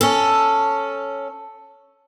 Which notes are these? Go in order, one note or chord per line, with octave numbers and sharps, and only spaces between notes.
C#4 A4